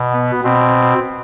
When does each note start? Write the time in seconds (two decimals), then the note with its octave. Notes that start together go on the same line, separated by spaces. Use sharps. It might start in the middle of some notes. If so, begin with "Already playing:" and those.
Already playing: B2
0.13 B3
0.44 B2 C4